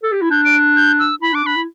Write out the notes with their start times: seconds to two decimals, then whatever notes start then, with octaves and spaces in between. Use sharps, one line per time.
0.03 A4
0.12 G4
0.21 E4
0.30 D4 G6
0.45 D7
0.76 G6
0.99 E6
1.22 E4 B5
1.33 D4 D6
1.45 D4 B5
1.56 E4